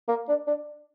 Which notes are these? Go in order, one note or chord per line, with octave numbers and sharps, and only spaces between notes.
A#3
D4
D4